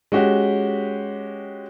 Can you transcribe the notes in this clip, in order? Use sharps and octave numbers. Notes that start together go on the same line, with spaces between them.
G#3 C#4 F#4 G4